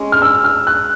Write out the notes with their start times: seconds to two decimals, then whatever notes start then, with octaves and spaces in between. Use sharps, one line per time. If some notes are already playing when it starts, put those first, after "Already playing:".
Already playing: G#3 C#4
0.12 F6
0.22 E6
0.44 F6
0.67 F#6